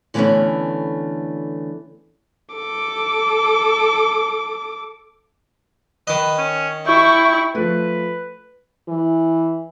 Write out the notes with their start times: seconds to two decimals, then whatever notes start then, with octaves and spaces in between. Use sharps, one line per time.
0.14 D3 E3 G3 A3 B3 C#4
2.55 A4 D6
6.07 D#3 B4 D#5
6.38 C#4
6.87 E4 G5 C#6
7.55 F3 A3 B4
8.88 E3